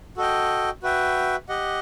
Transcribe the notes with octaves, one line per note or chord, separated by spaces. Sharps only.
F#4 A4 D#5 G5
F#4 B4 E5 G5
G4 D#5 F#5